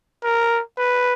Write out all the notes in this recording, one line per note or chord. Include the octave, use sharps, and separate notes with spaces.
A#4
B4